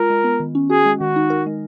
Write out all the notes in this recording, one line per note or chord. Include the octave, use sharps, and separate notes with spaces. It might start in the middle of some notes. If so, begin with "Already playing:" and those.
Already playing: G#3 F4 A#4
G#3
B3
D#3
C#4
F#4 G#4
G#3
D#3 F#4
D#4
A#4
G#3